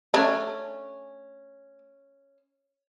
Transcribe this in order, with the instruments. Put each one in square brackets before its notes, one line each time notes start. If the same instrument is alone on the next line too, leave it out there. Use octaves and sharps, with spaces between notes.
[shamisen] A3 D4 [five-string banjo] C#4 G#5